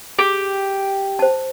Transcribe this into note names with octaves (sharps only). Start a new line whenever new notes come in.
G4 G#4
C5 A5